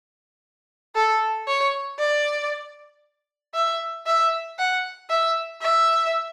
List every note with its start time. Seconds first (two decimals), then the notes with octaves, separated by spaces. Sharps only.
0.95 A4
1.47 C#5
1.99 D5
3.54 E5
4.06 E5
4.58 F#5
5.09 E5
5.62 E5